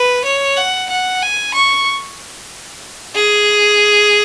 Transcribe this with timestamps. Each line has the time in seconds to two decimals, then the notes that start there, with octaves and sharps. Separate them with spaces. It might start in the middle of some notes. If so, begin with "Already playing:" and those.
Already playing: B4
0.25 C#5
0.57 F#5
0.89 F#5
1.22 G#5
1.54 C#6
3.15 G#4